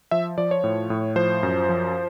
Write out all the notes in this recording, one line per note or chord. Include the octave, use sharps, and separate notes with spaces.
F3 E5
F3 D5
C#5
A2
A2
F3 C5
F#2
F3